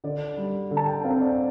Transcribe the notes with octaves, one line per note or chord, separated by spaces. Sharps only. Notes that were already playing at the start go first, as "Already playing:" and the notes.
D3 D5
G3
D3
A5
G5
C4 F5
D5